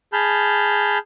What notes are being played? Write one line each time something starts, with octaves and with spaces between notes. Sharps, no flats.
G#4 A5 B5 F6 G6